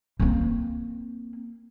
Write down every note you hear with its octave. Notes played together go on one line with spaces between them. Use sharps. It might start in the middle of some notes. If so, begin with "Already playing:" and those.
A#3 C4